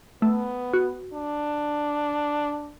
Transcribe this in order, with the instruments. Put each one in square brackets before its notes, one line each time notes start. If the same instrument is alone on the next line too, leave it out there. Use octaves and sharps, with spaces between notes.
[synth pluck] A3 [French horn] B3
[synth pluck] F#4
[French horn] D4